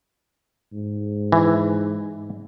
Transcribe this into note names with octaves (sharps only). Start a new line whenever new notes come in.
G#2
E3